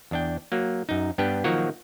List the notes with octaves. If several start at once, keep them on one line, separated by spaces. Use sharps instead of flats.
E2 D4 G5
F#3 A#3
F#2 D#4
G2 B3 D4 G4 B4 G5
D#3 F3 F#3 A#3 F#4 C#5